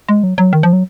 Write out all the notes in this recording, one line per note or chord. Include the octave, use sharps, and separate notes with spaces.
G#3
F#3
F#3
D#3
F3
F#3